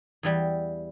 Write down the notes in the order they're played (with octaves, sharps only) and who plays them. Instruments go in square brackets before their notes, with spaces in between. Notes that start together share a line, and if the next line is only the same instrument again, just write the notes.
[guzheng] E2 E3 G3